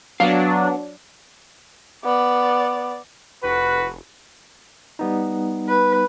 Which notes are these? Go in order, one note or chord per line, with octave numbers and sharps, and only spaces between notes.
F#3 B3 D4 F5
B3 D5
F1 F#4 B4
G3 B3 D#4
B4